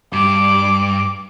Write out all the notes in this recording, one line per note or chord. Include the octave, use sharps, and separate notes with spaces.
G2 D6